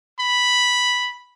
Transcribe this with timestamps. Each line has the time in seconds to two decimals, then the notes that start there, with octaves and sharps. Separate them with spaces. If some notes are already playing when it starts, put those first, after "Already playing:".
0.19 B5